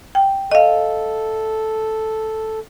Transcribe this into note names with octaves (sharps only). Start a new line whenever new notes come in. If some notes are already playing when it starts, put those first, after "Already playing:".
G5
A4 D#5 F5